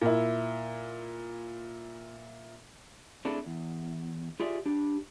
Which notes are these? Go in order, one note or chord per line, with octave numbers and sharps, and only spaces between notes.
A#2 E4
A3 C4 D4 E4 G#4 A4
E2
F4 G4 G#4 D5 E5
D4 G4